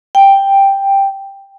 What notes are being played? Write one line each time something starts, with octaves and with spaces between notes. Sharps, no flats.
G5